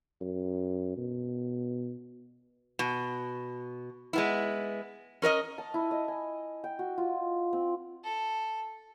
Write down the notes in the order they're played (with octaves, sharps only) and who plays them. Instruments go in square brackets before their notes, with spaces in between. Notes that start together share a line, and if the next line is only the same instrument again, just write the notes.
[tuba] F#2
B2
[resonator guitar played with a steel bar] B2
G#3 B3 E4
C#4 A#4 D5 D#5
[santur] A5
E4
D#5
G#5
G5
F#4
F4
C4
[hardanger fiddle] A4